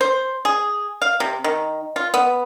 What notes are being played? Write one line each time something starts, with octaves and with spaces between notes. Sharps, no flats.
C5
G#4
F5
C3
D#3
F4
B3